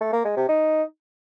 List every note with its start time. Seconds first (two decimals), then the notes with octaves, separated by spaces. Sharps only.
0.01 A3
0.13 A#3
0.25 G#3
0.37 C3
0.49 D#4